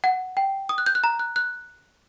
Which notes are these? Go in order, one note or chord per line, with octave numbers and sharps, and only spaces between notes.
F#5
G5
D#6
F#6
G6
F#6
A#5
F#6
F#6